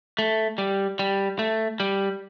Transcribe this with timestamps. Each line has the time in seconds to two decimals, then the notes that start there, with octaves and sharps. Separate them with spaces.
0.19 A3
0.58 G3
0.99 G3
1.39 A3
1.80 G3